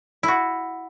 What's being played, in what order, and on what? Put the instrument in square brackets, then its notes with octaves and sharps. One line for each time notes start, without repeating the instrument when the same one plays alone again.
[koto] E4 F#4